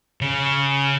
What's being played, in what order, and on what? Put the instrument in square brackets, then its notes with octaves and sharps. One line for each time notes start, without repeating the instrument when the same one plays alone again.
[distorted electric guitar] C#3